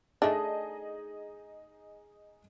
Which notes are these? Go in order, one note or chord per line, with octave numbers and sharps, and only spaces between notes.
A3 D4 D#4 G#4 D#5